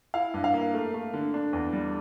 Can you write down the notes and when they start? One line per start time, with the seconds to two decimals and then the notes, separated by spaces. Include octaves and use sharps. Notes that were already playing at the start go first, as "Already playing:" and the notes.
0.14 E4 F5
0.34 G2
0.44 F5
0.54 A#3
0.74 A3
0.94 A3
1.14 D3
1.34 D4
1.53 E2
1.73 G3